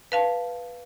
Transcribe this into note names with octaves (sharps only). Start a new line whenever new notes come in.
B4 F5 A5